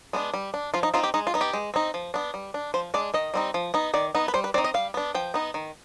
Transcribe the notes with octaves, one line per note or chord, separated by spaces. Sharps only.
G#3 B3 D4
G3
D4
F3 F4
D#4
C4 D#4 F4
G4
G#3 D#4
F4
B3 D#4
G4
G#3
C4 D#4
F3
B3 D4
G3
D4
F3 C5
G#3 D4 D5
D#3 D#5
G3 C4 D#4
F3
B3 D#4
D#3 D5
B3 D#4
B4
G3 C5
B4
C4 D#4 D5
D#5
G3 F5
B3 D4
F3 G5
B3 D#4
D#3